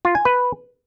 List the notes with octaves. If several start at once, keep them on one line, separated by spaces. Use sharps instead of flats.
F4
G#5
B4